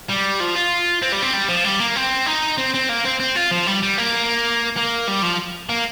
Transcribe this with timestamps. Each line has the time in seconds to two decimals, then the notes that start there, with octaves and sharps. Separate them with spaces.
0.09 G3
0.40 F3
0.55 F4
1.02 C4
1.12 G3
1.22 C4
1.33 G3
1.49 F3
1.65 G3
1.80 A#3
1.96 C4
2.26 D#4
2.58 C4
2.74 C4
2.89 A#3
3.05 C4
3.20 C4
3.36 F4
3.51 F3
3.67 G3
3.83 G3
3.98 A#3
4.77 A#3
5.07 G3
5.22 F3
5.69 A#3